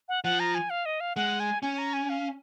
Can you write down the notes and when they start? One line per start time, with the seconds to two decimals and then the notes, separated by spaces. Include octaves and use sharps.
0.09 F#5
0.24 F3 F#5
0.40 A#5
0.55 G#5
0.70 F5
0.86 D#5
1.00 F5
1.16 G#3 F#5
1.40 G#5
1.63 C#4 G#5
1.78 A#5
1.93 G#5
2.09 F5